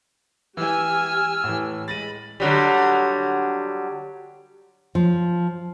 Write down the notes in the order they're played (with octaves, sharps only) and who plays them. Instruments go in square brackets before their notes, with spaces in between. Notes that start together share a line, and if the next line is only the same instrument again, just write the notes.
[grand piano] E3 [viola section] G4 G#5 [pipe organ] E6 F6
[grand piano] A2 E3
[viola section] G#3 [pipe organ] B5 [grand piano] A6 A#6 D#7
[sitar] D3 F#3 G3
[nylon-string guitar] F3